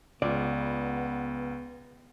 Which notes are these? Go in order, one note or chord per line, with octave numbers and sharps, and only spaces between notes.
C#2 B3 F4 D5